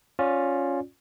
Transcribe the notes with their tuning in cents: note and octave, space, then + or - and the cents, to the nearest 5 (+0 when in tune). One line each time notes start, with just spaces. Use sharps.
C#4 +0 F4 +20 D5 +0